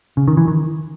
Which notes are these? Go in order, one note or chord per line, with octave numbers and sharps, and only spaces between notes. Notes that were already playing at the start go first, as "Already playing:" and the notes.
C#3
D#3
E3
D#3